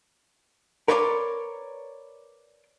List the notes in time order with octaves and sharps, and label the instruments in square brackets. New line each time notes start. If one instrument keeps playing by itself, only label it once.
[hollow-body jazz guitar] A#4 B4 C#5 D5 G#5 C6